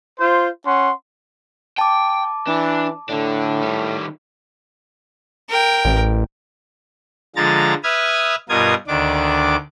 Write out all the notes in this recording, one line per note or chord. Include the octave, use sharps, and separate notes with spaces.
F4 C5
C#4 F#5 C6
G5 A5 D6
E3 D4
A2 D3 D4
D#3 G3
A#4 G5
A1
D3 F3 G#3 A#5 A6
B4 E5 D#6 F6 G#6
G2 B2 F4 A#4 D#6 G#6
D2 D#3 D4 D6